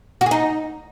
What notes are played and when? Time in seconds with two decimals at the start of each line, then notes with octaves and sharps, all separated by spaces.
0.21 F#4
0.26 G#4
0.31 D#4